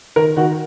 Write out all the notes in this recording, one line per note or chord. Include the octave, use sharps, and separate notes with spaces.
D#3 A#4
D#3 F#4